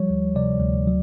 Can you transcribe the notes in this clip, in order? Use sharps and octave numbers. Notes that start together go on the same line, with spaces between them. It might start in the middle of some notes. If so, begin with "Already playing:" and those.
Already playing: F3 G3 C#5
D2
C3 D5
D2
F#3